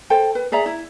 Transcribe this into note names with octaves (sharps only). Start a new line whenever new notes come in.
A4 C5 G5
B4
G#4 D5 E5 A#5
E4